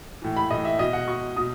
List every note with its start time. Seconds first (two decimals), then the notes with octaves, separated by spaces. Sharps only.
0.22 A2 E3
0.37 B5
0.50 A2 E3 D#5
0.65 E5
0.79 B2 D#5
0.93 F#5
1.07 B2 C#6
1.37 B2 D#6